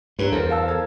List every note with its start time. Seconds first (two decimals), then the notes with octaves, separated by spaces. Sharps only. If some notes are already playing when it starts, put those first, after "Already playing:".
0.19 G2 B4 C#5 E5 A#5
0.32 E2 A4 A#4 C5
0.50 F5 A5 E6
0.68 A4 A#4 G#6